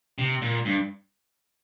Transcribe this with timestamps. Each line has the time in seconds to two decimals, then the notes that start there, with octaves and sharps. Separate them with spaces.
0.19 C3
0.42 A#2
0.65 G2